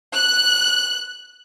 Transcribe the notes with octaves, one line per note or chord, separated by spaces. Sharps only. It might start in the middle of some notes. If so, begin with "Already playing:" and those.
F#6